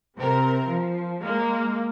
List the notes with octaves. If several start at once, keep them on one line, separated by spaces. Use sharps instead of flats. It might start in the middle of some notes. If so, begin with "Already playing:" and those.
C3 C4 A#4
F3
G#3 A#3